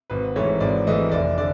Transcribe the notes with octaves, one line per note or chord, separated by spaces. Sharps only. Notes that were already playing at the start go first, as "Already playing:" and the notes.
G#1 B4
G#2 E3 A3 C#5
G#1 D5
G#2 E3 A3 D#5
F1 D5
D3 D5